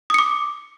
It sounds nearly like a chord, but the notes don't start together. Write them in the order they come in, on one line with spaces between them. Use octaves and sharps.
D#6 C#7 D6